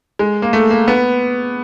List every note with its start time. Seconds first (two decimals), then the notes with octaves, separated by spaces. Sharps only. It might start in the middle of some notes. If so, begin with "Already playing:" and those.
0.19 G#3
0.42 A#3
0.53 A3
0.70 A#3
0.88 B3